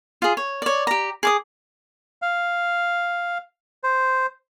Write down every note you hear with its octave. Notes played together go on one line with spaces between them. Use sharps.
F4 G#4
C#5
C#5 D5
G4 A#5
G#4 D6 D#6
F5
C5